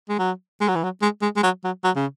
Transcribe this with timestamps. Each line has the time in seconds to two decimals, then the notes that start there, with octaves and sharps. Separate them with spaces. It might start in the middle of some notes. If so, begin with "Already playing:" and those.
0.09 G#3
0.19 F#3
0.61 G#3
0.68 F#3
0.75 E3
0.84 F#3
1.02 G#3
1.22 G#3
1.36 G#3
1.43 F#3
1.64 F#3
1.84 F#3
1.96 C#3